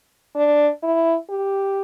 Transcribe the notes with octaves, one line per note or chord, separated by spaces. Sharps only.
D4
E4
G4